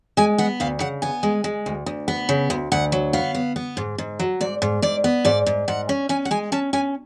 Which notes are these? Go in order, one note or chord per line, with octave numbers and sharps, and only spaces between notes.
G#3 G#5
B3 F#5
D2 F5
C#3 F#5
B3 G#5
G#3
G#3
D2
D2
B3
C#3
D2
D2 F#5
F#3
B3 F5
B3
B3
G#2
G#2
F#3
G#2 D5
G#2
G#2 D5
B3
G#2 D5
G#2
G#2 F#5
C#4
C#4 G#5
F#5
G#3 G#5
C#4 A5
C#4 G#5